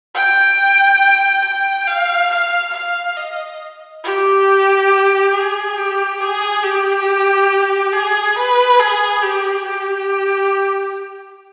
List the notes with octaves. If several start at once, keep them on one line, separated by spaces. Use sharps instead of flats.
G5
G5
F5
F5
F5
D#5
G4
G#4
G4
G#4
G4
G#4
B4
G#4
G4
G4